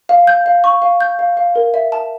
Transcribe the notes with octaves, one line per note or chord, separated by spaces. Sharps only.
F5
G6
F5
C#6
F5
G6
F5
F5
A#4
E5
A5